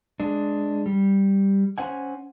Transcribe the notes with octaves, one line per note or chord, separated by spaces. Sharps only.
G#3 D4
G3
C#4 C5 F#5 G#5